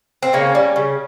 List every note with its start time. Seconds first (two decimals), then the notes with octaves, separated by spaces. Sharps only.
0.22 C4
0.33 C#3 A#3 C#4
0.55 G3
0.76 C#3